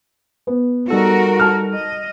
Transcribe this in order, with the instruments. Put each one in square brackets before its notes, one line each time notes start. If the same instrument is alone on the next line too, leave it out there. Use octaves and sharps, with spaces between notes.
[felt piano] B3
[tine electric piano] G3 D#4 A4 [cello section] F#4 A#4
[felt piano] A5 F6
[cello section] D#5